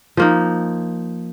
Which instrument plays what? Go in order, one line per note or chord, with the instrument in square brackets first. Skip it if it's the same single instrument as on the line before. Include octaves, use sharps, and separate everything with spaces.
[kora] F3 A#3 D#4